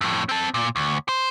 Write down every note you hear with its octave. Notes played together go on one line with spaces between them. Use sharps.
F2 A2
C4 A5
A#2
D2
C5